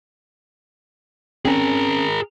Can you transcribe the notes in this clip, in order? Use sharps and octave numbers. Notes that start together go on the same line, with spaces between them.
C4 C#4 G#4 A#4